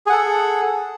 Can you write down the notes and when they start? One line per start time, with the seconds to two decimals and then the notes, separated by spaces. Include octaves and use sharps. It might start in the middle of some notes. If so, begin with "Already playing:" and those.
0.07 G#4
0.09 F#5
0.12 A4